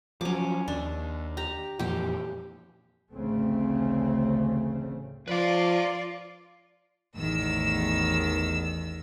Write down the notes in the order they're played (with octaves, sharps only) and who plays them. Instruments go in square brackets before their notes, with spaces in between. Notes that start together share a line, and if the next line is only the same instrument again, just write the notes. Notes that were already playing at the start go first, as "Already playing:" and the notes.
[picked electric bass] F3 F#3 [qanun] C#4 D6
[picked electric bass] D#2 [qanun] D4
[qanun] G4 A#5
[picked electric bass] F2 A#2 E3 [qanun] G4 G5
[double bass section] A1 D2 C#3 A3 C4
[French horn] F3 [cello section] F4 D5 [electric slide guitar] B4 F5
[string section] A1 E2 D#3 E6